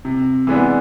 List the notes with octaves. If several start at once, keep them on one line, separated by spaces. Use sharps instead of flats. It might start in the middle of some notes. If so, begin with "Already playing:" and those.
C3
E3 G#3 B3 D4